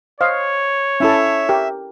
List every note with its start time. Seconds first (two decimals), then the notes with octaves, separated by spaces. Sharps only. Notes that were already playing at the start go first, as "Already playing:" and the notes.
0.21 C5 C#5 D#5 F5
1.00 C#4 E4 A4 E5
1.49 G4 A#4